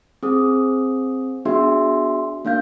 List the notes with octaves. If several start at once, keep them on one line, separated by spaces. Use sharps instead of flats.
C4 G#4 D#6
B3 D4 F#4 G#4 E5 C6
A#3 D4 F5 G6